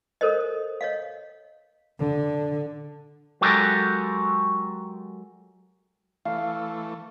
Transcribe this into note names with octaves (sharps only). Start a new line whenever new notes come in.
A4 A#4 C5 C#5 D#5
C#5 D#5 F5
D3
F#3 G#3 F#4 G4 A4 A#4
E3 A3 F5